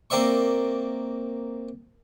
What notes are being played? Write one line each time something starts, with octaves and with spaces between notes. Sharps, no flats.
A#3 C4 D5 E5 C#6